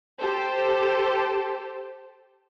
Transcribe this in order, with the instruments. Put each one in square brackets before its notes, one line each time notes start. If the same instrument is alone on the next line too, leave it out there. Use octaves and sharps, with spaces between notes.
[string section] G4 A4 C5